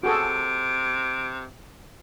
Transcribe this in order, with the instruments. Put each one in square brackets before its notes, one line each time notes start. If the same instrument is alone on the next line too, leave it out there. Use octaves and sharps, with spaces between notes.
[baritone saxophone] C3 [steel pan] F#4 G#4 A4 [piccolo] D7